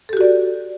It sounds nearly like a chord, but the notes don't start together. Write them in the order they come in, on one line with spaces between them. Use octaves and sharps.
A4 G4 F#4 D5